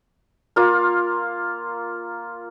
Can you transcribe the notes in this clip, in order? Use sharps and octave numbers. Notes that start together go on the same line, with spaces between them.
A#3 F4 F5